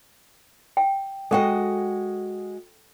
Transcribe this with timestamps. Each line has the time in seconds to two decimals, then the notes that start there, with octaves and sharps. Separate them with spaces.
0.77 G5
1.31 G#3 F#4 A4 D#5 G5